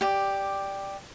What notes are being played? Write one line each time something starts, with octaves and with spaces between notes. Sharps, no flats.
G4 D5